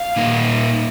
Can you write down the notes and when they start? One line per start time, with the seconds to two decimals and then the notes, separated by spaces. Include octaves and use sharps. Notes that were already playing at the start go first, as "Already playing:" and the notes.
Already playing: F5
0.16 A#2 A#3 D#4